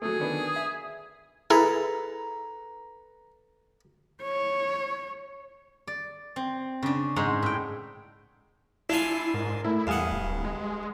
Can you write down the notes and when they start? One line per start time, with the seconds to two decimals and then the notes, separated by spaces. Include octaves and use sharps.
0.02 F#3 A3 G#4
0.20 D#3 B3 D4
0.56 E5
1.50 E4 G#4 A4 B4 A#5
4.23 C#5
5.87 D5
6.36 C4
6.82 C#3 D4
7.16 G#2 G#3 G#4 C5 F#5 A#5
7.43 A2 G5
8.89 D4 E4 F4 G#5
9.34 G#2 A#4
9.64 A2 E4
9.87 E2 G2 F5 F#5 G#5 D#6
10.12 D1
10.45 G#3